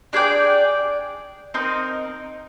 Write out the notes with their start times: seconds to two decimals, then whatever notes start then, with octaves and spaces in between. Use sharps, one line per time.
0.13 D4 G#4 D5 G5
1.54 C4 D#4 A#4 D#5